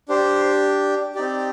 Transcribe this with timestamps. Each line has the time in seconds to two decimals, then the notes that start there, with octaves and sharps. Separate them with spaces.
0.09 D4 G4 C5
1.15 C4 D#4 G4 D5